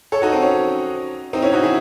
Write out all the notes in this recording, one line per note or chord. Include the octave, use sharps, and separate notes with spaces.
A4 C#5
D#4 F#4
C4
C#4
C4 D#4
C#4 E4
D#4 F#4
E4 G#4